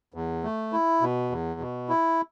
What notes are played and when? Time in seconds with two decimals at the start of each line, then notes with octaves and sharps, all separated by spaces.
0.14 E2
0.44 A3
0.72 E4
1.01 B2
1.31 E2
1.60 B2
1.89 E4